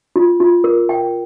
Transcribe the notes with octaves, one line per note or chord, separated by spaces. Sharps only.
F4
F4
A#4
G5